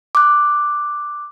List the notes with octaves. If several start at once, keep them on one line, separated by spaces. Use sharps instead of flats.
D6 F#6